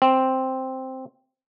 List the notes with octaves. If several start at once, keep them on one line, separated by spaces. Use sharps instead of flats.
C4